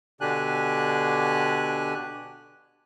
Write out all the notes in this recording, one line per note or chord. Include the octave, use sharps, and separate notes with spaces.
B2 D3 D4 G4 G#5 F#6